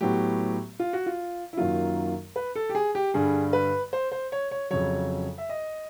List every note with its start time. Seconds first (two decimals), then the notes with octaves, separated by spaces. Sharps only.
0.01 A2 F#3 B3 G4
0.80 F4
0.93 F#4
1.06 F4
1.53 E4
1.57 F#2 D#3 F#3 A#3 F4
2.36 B4
2.55 A4
2.69 G4
2.75 G#4
2.95 G4
3.14 G2 D3 G3 G#4
3.53 B4
3.93 C5
4.12 C5
4.32 C#5
4.51 C#5
4.70 F2 C#3 F#3 C#5
5.38 E5
5.49 D#5